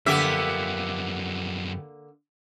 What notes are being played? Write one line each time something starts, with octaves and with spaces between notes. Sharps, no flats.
F#2 D3 F3 A#3 B3 G4 E5